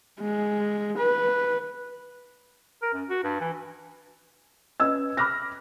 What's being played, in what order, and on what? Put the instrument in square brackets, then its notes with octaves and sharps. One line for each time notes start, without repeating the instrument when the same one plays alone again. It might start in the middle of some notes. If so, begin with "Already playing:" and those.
[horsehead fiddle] G#3
B4
[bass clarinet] A#4
F#2
F#4
G2
E3
[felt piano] C#4 B4 D#5 E6 G#6
B5 D6 F6 F#6 A#6